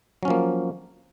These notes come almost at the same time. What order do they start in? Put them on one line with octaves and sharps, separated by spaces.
F#3 C#4 F3 A#3